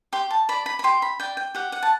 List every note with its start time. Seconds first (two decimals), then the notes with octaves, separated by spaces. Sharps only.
0.13 G4 C6
0.31 A5
0.49 D5 B5
0.66 B5
0.79 B5
0.84 G4 C6
1.02 B5
1.20 D5 G5
1.37 G5
1.55 G4 F#5
1.72 F#5
1.83 A5